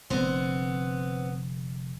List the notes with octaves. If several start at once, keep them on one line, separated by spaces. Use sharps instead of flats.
F1 D3 B3 C4